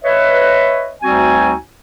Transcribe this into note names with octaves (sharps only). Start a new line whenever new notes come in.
B4 C#5 D#5 E5
D2 G3 C4 D#4 F#4 G#5